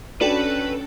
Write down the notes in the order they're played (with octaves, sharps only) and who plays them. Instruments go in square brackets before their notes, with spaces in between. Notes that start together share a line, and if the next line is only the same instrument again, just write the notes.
[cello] C#4 [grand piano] D4 [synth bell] F#4 A4 G5 [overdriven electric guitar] B4